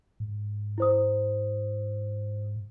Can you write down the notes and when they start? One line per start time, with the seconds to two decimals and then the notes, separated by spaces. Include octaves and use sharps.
0.20 G#2
0.78 E4 C5 D#6